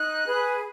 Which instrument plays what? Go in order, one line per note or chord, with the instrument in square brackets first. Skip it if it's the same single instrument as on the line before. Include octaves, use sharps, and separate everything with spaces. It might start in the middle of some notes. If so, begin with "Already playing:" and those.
Already playing: [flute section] D#4 F#6
G#4 B4